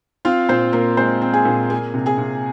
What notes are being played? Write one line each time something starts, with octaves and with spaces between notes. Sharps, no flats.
C4 F4 F5
A#2 C4 C5
A#2 A#3 A#4
G#3 C4 C5
C4
G#4 G#5
A#2
A#3 G#4 G#5
C3
G#4 G#5
C3